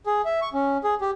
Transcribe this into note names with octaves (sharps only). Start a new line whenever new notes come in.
G#4
E5
C#6
C#4
G#4
G4